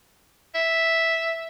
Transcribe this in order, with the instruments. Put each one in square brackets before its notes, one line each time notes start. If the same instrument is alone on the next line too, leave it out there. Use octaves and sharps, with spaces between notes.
[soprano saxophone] E5